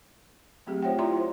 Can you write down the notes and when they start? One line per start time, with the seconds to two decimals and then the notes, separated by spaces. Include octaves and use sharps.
0.67 F#3 A3 C4 G4 G#4
0.82 F4 C5 C#5 E5 F#5 G5
0.99 E4 F4 D5 E5 A#5 C6
1.16 C5